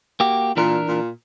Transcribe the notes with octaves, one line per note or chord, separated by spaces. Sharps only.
A#3 F#4 G4
A#2 E3 D4 A#4
A#2